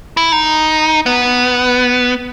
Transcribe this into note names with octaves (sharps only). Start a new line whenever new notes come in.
E4
D#4
B3